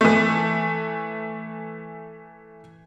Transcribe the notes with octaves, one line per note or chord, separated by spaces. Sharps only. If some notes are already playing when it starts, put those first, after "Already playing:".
E3 A3